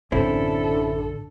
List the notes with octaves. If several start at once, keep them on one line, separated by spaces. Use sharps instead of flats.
A1 F#2 D3 C4 C#4 E4 A4